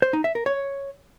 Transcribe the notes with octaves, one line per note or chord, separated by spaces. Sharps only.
C5
D#4
E5
A#4
C#5